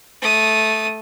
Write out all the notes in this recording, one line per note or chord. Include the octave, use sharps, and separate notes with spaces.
A3 D#6